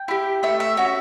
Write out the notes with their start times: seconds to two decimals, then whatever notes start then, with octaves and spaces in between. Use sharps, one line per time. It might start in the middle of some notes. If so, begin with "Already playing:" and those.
Already playing: G5
0.08 E4 G4
0.43 A3 E5
0.60 E5
0.77 C#4 F#4 E5